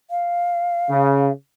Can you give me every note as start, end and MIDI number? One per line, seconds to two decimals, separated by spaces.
0.10 1.32 77
0.90 1.29 49